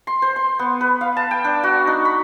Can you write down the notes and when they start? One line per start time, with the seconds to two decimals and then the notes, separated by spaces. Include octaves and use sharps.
0.07 C6
0.22 C5
0.36 C6
0.59 B3
0.81 B4
1.01 F5
1.17 A5
1.31 G5
1.44 D4
1.63 F#4
1.87 D#4
2.05 B5